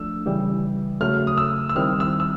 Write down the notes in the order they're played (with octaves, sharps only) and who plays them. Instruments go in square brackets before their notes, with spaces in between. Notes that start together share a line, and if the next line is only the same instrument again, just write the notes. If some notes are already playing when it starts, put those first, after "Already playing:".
Already playing: [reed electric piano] F3 A3 D4 [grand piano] E6
[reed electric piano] C#3 E3 G3
[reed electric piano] C#3 F#3 A3 [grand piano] F6
[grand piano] D#6
E6
E6
[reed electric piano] D#3 G3 C4 E4 [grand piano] F6
[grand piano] E6
E6